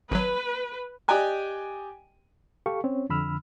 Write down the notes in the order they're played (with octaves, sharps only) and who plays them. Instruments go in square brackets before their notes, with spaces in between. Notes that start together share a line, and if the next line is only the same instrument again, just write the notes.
[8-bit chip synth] G#1 F#3 [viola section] B4
[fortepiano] G4 D5 D#5 G5 G#5 F#6
[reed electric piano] G4 A4 F5 C#6
C4 C#4 C#5
F2 D3 B5 E6 F6